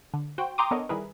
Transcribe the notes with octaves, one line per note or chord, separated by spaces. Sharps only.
D3
F#4 C5 G5
G5 A#5 C6 D6 D#6
B3 D4 A4 A#4 C#5 D#5
D#3 G3 E4 G#4 A#4 B4